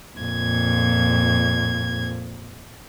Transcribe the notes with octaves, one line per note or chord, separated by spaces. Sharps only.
F2 A#2 G#6